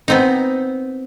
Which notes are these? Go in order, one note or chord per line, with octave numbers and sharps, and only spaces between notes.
B3 C4 D#4